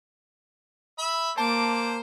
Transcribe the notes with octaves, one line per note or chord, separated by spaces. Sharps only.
E5 B5
A#3 C5 A5 D6